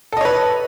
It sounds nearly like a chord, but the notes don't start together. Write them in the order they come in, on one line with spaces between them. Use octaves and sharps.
A4 D#5 C#5 B4